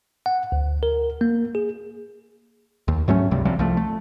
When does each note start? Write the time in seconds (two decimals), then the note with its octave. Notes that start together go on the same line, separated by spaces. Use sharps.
0.26 F#5
0.52 D2
0.83 A#4
1.21 A#3
1.55 G#4
2.88 D#2
3.08 G#2 F#3 A3 C#4
3.31 C#2 G2 C3 G3
3.45 B1 C3 F3 G3
3.59 C2 F3 A3
3.77 A3